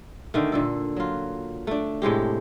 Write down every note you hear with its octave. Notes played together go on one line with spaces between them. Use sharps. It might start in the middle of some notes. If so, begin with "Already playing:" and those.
D3 D#3 A3
A#2 D3 A4
F#3 F4
A3 D4
A2 C3 G#3 G4